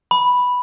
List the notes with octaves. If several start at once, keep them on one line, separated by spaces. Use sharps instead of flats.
B5